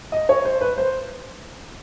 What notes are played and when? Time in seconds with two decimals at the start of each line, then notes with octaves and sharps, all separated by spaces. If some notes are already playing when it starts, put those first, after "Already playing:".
0.12 D#5
0.29 C#5
0.45 C5
0.61 B4
0.78 C5